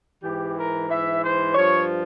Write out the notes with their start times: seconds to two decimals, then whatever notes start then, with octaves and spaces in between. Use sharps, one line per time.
0.23 G#2 E3 G4
0.56 A#4
0.89 G#2 E3 E5
1.22 C5
1.55 G2 F3 C#5